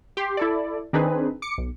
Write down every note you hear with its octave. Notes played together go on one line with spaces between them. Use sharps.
G4 C6
E4 A4 D5
D#3 C4 D4 D#4 G#4 B4
D6 C#7
B1